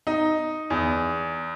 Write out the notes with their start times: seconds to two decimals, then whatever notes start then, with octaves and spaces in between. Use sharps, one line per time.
0.07 D#4
0.70 E2